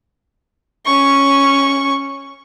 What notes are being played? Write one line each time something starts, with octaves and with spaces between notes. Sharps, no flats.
C#4 C#6